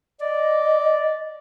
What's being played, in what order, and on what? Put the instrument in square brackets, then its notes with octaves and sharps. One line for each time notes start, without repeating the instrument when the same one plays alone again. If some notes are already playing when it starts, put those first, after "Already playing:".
[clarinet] D5 [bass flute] D#5